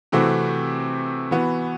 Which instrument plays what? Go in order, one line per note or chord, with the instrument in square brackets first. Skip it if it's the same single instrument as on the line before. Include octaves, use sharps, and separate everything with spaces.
[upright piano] C3 E3 A3 C4 F#4
E3 B3 F#4